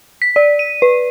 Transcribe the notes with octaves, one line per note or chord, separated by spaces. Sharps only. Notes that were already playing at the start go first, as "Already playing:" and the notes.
B6
D5
D#7
B4